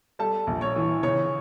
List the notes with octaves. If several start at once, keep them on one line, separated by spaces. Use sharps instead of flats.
G3 A4 A5
A#1
C#5 C#6
E3
C#3 C#5 C#6